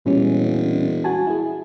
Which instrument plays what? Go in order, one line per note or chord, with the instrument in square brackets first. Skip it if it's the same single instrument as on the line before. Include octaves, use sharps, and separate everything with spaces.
[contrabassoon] E1 [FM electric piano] A#2 G3 C#4
[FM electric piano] F#4 G#5 A5
E4 G#4